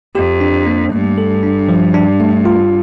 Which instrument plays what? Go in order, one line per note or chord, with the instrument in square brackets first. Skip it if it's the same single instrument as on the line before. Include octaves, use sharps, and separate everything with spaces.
[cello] F2 [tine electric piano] G4
[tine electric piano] D4
A#3
[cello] G2 [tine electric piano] A3
[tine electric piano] A4
D4
F3
D4
A3
F4